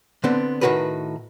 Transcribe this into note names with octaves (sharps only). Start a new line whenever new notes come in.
D3 B3 C4 D4
A2 D#3 F#3 F#4 A#4 B4